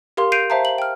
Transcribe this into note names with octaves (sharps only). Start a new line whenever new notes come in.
G4 A#4 F5 C6
G6 C7 D7 D#7 F7
C5 E5 F5 A5 A#5
F#7
G5 F6